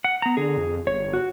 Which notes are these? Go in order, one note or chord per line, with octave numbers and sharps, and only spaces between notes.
F#5
B3 A#5
D3 G#4
F2
G1 C#5
F#4